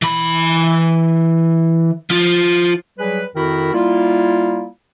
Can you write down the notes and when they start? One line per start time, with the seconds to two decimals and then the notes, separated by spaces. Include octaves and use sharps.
0.02 E3 B5
2.10 F3 F4
2.99 F#3 G3 G#4 B4
3.36 F2 D#3 E4 F#4 A#4 B5
3.73 G3 A#3 E4 F4